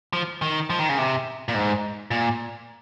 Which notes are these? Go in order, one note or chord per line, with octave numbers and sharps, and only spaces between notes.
F3
D#3
F3
D#3
C#3
C3
A#2
G#2
A#2